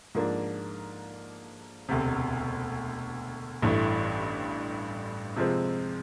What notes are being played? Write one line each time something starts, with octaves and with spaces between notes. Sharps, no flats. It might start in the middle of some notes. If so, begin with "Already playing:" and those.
G#2 F3 A#3 D4
E1 D2 C3
A1 G2 E3 A3
C3 F3 G#3 C4